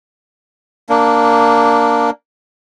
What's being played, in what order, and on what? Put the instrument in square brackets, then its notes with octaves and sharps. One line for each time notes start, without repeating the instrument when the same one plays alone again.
[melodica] A#3 D4